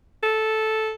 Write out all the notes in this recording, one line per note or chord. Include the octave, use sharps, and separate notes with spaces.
A4